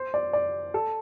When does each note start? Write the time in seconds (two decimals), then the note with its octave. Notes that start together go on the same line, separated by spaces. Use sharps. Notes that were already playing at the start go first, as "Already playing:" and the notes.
Already playing: C5
0.14 D5
0.33 D5
0.74 A4